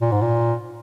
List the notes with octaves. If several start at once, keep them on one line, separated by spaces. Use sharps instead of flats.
A#2
G#2
A#2